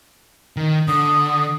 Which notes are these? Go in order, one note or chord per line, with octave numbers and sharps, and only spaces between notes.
D#3
D3 D#6